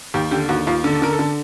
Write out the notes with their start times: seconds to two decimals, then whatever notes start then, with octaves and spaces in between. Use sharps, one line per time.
0.14 D#2 G4
0.31 D3 G4
0.49 D#2 F#4
0.67 D#2 F4
0.84 D3
0.93 A4
1.02 D3 A#4
1.13 A4
1.19 D3